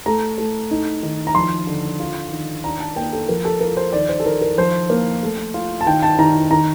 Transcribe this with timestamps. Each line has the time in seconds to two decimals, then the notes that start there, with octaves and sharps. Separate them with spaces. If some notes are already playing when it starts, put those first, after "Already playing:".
0.06 A3 A#5
0.38 A3
0.71 D#4
1.03 D#3
1.27 A#5
1.35 F3 C6
1.67 D3
2.00 F4
2.32 D#3
2.64 D4 A#5
2.80 A5
2.96 A#3 G5
3.13 A4
3.29 F3 A#4
3.45 A4
3.60 F4 A#4
3.77 C5
3.93 D#3 D5
4.09 C5
4.20 A4
4.25 D#3 A#4
4.42 A#4
4.58 F3 C5
4.90 A#3
5.23 A3
5.54 F4
5.81 A5
5.86 D#3 G5
6.03 A5
6.19 D#3 A#5
6.51 D#3 A#5